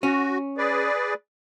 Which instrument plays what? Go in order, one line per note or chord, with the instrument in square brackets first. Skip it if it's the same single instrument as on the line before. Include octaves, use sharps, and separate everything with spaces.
[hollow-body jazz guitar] C#4 [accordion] F#4
[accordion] G#4 B4 D5